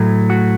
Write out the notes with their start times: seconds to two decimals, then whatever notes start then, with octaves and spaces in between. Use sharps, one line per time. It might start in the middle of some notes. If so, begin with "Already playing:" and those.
Already playing: A2 F#3 A3
0.30 F#4